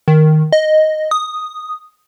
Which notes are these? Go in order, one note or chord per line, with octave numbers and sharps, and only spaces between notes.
D#3
D#5
D#6